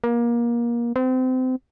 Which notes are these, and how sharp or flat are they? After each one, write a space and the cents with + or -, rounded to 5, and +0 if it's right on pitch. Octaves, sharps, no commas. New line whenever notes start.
A#3 +25
C4 -30